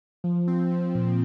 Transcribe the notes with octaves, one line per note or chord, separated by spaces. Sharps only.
F3
C4
F3
A#2